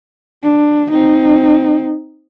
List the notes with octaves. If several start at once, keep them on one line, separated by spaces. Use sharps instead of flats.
D4
C4 D#4